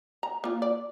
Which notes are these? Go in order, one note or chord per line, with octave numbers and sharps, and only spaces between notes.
A#5
A#3 F4
D5